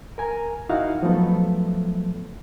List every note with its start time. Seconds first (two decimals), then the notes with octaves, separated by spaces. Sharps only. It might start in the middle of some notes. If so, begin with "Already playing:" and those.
0.18 A#4 G#5 A#5
0.69 D#4 E4 F#4 F5 F#5
1.03 F3 F#3 A3 B3 A4